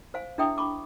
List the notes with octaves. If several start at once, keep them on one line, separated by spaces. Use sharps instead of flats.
C5 F5 G#5
D4 E4 G#4 E5 G5 D#6
B5 C#6 D6